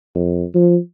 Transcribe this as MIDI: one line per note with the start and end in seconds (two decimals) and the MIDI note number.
0.15 0.44 41
0.55 0.78 53